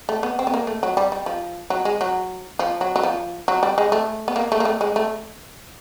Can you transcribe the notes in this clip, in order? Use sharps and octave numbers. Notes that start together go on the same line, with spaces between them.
A3
B3
C4
B3
A#3
A3
F#3
G3
G3
F3
F#3
G#3
F#3
F3
F#3
F#3
F3
F#3
G3
G#3
A3
B3
A#3
A3
A#3
A3
G#3
A3